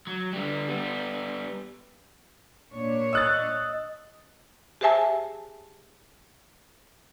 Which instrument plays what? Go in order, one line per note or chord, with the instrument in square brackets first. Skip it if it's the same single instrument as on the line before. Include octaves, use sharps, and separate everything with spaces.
[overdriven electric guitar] F#3
D3 G3
G3 B3
[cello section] A#2 D4 C#5
[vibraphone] D#5 D#6 [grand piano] E6 F#6 A6
[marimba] G4 G#4 C5 E5 G#5 A5